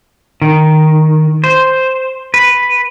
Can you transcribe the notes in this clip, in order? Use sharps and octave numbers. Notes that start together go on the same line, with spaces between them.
D#3
C5
B4